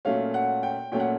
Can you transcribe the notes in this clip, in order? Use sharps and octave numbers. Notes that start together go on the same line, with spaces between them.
A#2 F#3 A3 C#4 F5
F#5
G5
A#2 F#3 A3 C#4 G5
F#5